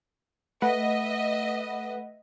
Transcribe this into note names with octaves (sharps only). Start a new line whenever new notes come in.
A3 B4 D#5 E5 F#5